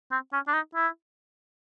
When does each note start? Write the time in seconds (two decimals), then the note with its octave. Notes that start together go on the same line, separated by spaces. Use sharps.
0.12 C4
0.33 C#4
0.48 D4
0.53 D#4
0.75 E4